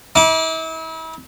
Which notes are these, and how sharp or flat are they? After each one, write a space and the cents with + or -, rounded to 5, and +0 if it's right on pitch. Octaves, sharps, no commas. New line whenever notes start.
E4 -40 D6 +0